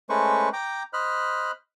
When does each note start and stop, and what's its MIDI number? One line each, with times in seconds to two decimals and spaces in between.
0.10 0.49 56
0.10 0.49 57
0.10 0.49 61
0.10 0.49 71
0.10 0.49 72
0.10 0.49 85
0.53 0.83 79
0.53 0.83 82
0.53 0.83 86
0.93 1.51 72
0.93 1.51 75
0.93 1.51 83
0.93 1.51 89
0.93 1.51 90